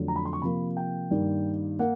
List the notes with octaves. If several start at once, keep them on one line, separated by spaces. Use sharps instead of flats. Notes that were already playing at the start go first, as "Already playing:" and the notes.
Already playing: F2 D3 F#3 A3
A#5
B5
C6
C#6
C3 F3 A#3 B5
G5
G2 D#3 G3 A#3
A#3 F#5